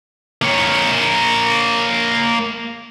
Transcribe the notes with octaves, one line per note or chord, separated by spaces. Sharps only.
A#3 C#5